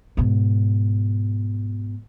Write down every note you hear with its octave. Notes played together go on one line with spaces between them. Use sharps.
G#2 B2